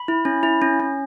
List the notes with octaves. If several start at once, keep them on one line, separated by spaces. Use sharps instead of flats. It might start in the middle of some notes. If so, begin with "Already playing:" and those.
Already playing: B5
E4
C#4
E4
C#4
C#4